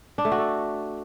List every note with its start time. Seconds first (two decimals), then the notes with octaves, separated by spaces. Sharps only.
0.18 D4
0.25 A3
0.32 F#4
0.38 A4